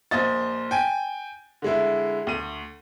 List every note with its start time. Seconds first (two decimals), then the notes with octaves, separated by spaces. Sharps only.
0.11 A#1 C5 D#5 A6
0.71 G5 G#5
1.62 D3 G#3 E4
2.27 D2 D#7